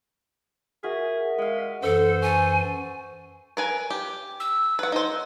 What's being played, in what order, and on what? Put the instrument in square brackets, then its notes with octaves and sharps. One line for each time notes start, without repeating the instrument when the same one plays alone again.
[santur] F#4 [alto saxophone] G#4 [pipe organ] A#4 E5
[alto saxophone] G#3 [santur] F5 F#5
[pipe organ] F#2 E3 [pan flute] A4 [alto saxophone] C5 [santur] E6
[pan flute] G#5 [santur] A5 C#6
[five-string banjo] A#4 B4 G#5
G4
[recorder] E6
[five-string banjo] B4 F#5
D#4 C5